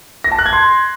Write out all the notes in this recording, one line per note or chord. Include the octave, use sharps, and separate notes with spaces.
A#6
A5
F#6
G#6
C6